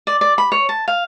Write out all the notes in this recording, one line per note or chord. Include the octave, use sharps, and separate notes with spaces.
D5
D5
B5
C#5
A5
F5